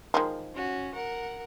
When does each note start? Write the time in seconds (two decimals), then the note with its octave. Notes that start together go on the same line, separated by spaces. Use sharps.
0.14 D#3 F3 G#3
0.55 C#4 F#4
0.95 A#4 F#5